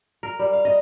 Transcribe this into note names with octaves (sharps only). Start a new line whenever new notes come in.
A#4
G3
F5
D#5